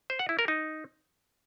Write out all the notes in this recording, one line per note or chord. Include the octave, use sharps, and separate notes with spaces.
C5
F#5
E4
A#4
D#4